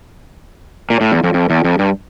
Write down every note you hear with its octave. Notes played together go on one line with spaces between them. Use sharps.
A#2
A2
E2
F2
F2
E2
F2
G2